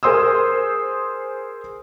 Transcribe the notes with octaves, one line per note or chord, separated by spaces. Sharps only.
G#4 A#4 C5 C6 D#6 E6